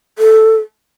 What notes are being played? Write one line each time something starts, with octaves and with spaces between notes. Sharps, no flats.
A4